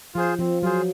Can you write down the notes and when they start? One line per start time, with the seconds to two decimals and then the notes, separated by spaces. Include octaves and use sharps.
0.15 F3 F4 G#4 C5
0.39 F3 C4
0.63 F#3 F4 G#4 C5